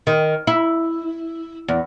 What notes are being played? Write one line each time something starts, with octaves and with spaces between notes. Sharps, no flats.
D#3
E4
E2